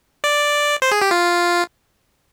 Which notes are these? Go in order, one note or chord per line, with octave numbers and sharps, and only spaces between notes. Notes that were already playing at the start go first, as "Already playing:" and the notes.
D5
C5
G#4
G4
F4